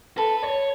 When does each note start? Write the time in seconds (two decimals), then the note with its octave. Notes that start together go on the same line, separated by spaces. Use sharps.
0.17 A4 B4
0.43 C#5